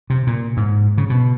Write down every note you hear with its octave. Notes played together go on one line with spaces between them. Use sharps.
C3
A#2
G#2
C#3
B2